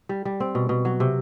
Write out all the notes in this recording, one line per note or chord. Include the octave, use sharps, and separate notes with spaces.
G3
G3
C4
B2
B2
F#3
C3